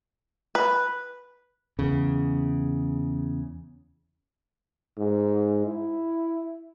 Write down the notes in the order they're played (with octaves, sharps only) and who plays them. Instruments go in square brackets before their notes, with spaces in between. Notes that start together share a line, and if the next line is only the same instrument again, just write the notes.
[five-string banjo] B4
[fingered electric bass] E2 C#3
[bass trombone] G#2
E4